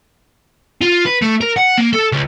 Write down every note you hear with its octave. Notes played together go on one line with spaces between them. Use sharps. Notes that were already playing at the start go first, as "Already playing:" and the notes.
F4
B4
A3
A#4
F#5
A#3
A4
C#2